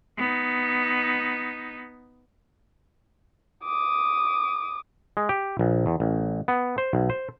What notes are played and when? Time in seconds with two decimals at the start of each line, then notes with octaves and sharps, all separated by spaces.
0.17 B3 D#4
3.65 D6 D#6
5.17 G#3
5.29 G4
5.59 A#1
5.86 E2
6.00 A1
6.48 B3
6.78 C5
6.93 B1
7.10 C5